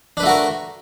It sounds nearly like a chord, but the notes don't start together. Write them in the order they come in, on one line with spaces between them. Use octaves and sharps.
D4 B4 A3 F#4 A#4